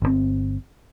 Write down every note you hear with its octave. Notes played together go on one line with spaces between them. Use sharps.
G1 C3 C4